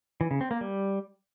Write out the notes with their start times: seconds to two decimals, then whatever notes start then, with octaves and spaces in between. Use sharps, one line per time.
0.21 E3
0.31 C#3
0.41 C4
0.51 A#3
0.61 G3